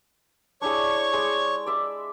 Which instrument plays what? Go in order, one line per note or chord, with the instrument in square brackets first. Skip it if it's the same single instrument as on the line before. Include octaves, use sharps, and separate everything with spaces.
[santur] D4 E4 G#4 [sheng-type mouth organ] C#5 C#6
[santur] G#3 D5
D5 E5 C6